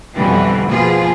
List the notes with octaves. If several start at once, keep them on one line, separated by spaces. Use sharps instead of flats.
F2 B2 D3 E3 F3 G3
B2 F3 A#3 F4 G#4